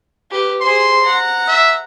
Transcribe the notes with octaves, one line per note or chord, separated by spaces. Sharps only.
G4 B4
G#4 C5 C6
F#5 A#5
E5